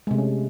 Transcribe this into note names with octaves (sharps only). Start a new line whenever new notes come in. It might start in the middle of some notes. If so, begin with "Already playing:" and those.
C3 G#3 A3 C#4